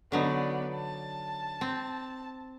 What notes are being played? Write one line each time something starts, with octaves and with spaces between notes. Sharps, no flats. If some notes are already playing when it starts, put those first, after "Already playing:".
D3 F#3 B3 D#4 D5
A5
C4